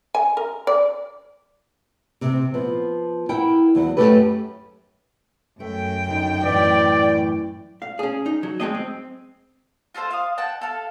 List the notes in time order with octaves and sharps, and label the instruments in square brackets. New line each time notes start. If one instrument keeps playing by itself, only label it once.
[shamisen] G#5
A#4
D5
[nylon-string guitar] C3 C4
F3 B3
E4 A#4 F#5 G5
E2 F#3 F#5
F#2 A#2 A3 G4 A4 B4
[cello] F#2 G5 [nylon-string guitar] A3
[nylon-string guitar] D3 D#4
[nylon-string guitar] A2 E3 [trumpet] D5
[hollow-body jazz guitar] F5
C#4 G#4
D#4
F#3
G#3 A3 C4 D#5
C4
[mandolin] F4 F#4 A4 C5
F5 D#6
F#5 G5 A5
A4 F5